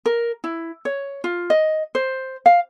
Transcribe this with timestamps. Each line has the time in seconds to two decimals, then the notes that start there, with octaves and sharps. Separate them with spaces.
0.06 A#4
0.44 E4
0.85 C#5
1.24 F4
1.50 D#5
1.95 C5
2.46 F5